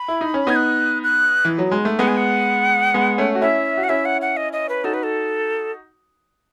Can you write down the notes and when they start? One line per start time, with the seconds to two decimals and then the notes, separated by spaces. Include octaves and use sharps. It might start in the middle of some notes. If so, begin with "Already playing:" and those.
Already playing: B5
0.08 E4
0.21 D#4
0.34 C#4
0.47 B3 D#4 G#6
0.56 F#6
1.04 F#6
1.45 E3
1.58 F#3
1.71 G#3
1.85 A3
1.99 G#3 B3 F#5
2.08 G#5
2.17 F#5
2.94 G#3 B3
3.18 A3 C#4
3.35 F#4
3.41 C#4 E4 E5
3.77 F#4
3.84 F#5
3.89 C#4 E4 E5
4.05 F#5
4.22 F#5
4.37 D#5
4.53 D#5
4.69 B4
4.84 D#4 F#4 A4
4.94 B4
5.03 A4